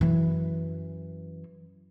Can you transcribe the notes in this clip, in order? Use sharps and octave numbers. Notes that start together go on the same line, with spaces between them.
F#2 E3